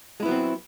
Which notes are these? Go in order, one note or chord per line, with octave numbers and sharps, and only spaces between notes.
F#3 G#3 B3 C4 E4